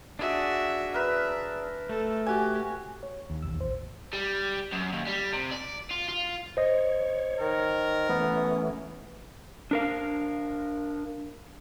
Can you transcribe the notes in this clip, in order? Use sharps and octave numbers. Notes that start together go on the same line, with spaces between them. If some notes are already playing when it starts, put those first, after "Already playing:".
D4 F#4 G#4 E5
A#4 B4 E5
A3 A4
F#4 G4 G#5
C#5
D#2
B1 E2 E6
A1 C5
G3
F#2
D#2
G3
C3
D5
F4
F4
C5 C#5 D#5
D#3 A#4
E3 A3 B3 C#4
D4 A#4 F5